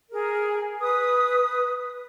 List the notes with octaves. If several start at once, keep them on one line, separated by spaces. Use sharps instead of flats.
G#4 A#4
B4 D#6